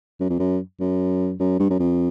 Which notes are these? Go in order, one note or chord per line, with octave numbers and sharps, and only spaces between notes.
F#2
F2
F#2
F#2
F#2
G2
F#2
F2